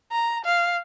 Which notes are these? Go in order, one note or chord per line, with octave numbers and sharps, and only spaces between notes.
A#5
F5